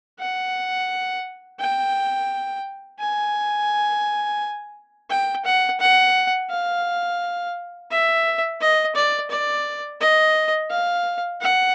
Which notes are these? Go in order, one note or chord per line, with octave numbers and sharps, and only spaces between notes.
F#5
G5
G#5
G5
F#5
F#5
F5
E5
D#5
D5
D5
D#5
F5
F#5